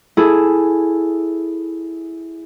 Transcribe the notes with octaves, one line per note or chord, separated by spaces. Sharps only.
E4 G#4 A4